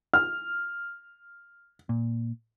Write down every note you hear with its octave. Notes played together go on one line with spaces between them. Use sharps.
F6
A#2